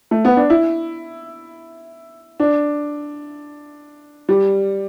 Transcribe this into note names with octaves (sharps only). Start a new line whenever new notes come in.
A3
B3
D4
E4
D4
G3